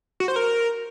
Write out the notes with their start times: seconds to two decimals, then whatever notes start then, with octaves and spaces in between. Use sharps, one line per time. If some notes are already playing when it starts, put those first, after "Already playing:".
0.20 F#4
0.28 C5
0.36 A#4